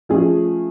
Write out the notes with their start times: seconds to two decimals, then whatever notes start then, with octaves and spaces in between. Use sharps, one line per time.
0.09 F3 A3 C#4 F4 G#4